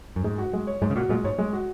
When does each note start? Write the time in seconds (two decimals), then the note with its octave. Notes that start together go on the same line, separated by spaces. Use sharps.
0.16 F#2
0.24 G#2 G#3
0.38 F#4
0.53 G#3
0.67 C#5
0.81 G#2 G#3
0.90 C#3
0.96 A#2 F#4
1.09 A#2 G#3
1.24 G#2 C#5
1.38 G#3
1.53 F#4